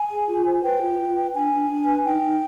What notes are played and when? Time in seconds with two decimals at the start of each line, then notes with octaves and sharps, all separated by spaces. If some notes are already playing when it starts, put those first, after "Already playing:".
Already playing: G#5
0.11 G#4
0.28 F4
0.46 C5
0.63 B4 G5
0.81 F4
0.99 F4
1.16 B4
1.34 D4 G#5
1.52 D4
1.69 D4
1.86 B4
2.03 D#4 G5
2.22 D#4